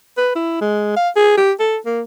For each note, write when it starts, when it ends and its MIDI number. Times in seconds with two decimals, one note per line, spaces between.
0.18 0.31 71
0.36 0.58 64
0.61 0.93 56
0.96 1.10 77
1.16 1.37 68
1.37 1.52 67
1.60 1.77 69
1.86 2.02 58